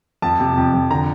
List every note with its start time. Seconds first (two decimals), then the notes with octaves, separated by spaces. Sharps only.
0.22 F2 A5
0.40 C3
0.57 F2
0.74 F2
0.91 D3 A#5